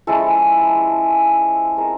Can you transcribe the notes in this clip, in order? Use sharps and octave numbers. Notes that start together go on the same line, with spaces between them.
F3 G#3 C#4 E4 A4
G#3 C4 F4 A#4